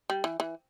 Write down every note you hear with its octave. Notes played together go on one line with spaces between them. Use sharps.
G3
E3
E3